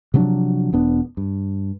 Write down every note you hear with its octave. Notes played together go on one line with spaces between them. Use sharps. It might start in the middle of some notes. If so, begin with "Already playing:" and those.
C3 F3 F#3 D4
E1 B3 D4
G2